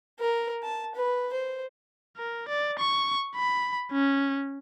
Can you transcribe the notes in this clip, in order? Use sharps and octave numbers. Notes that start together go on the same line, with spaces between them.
A#4
A5
B4
C5
A#4
D5
C#6
B5
C#4